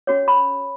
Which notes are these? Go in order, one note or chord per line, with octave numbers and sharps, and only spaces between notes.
C#4 F#4 C#5
B5